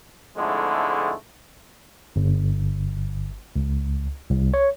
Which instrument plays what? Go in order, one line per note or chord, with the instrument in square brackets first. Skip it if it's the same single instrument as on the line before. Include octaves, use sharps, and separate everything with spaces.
[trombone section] F2 G#2 D3 G#3 A3 E4
[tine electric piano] G1
C#2
C2
C#5